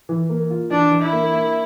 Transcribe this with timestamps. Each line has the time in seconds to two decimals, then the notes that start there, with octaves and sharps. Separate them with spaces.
0.09 E3
0.29 A#3
0.50 F4
0.71 E3 D4
0.91 E3
1.02 E4
1.12 A#3
1.33 A#3